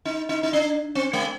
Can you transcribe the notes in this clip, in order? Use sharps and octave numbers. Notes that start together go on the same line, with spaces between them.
D#4
D#4
D#4
D4
C4
G#3